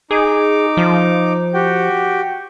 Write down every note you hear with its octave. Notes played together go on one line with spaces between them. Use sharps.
D#4 G#4 D6
F3
F#4 G4 G5